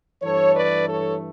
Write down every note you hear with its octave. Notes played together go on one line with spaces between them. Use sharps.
G2 E3 A3 A4 C#5
B4 D5
A4 C#5